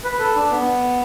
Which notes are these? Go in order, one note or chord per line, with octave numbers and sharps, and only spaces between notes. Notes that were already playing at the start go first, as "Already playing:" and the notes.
B4
A4
D4
B3